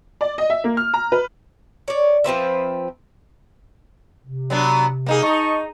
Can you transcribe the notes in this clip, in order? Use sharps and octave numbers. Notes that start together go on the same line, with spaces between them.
D5
D#5
E5
A#3
F6
A#5
B4
C#5 D5
F3 C4 B4 E5
C3
F#3 B3 D4
A#3 D#4 G#4
D#4 D#5 A5 C#6